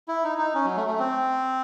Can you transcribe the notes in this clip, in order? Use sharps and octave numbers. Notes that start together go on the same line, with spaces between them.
E4
D#4
D#4
C#4
F#3
A3
A3
C4